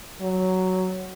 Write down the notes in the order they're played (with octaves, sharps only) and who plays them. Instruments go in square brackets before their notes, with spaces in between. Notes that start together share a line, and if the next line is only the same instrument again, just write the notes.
[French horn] F#3